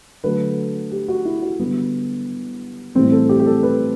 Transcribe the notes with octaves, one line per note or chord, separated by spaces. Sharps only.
D3 F#3 A3 B4
G4
F#4
E4
F#4
D3 G3 B3
A2 E3 G3 C4
A4
G4
G4
A4
B4